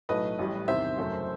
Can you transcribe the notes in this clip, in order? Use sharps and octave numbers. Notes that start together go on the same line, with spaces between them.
B1 A2 F#3 A3 B4 D#5
A1 A2 G3
E2 C3 D#3 C5 E5
F#1 F#2 F#3 A3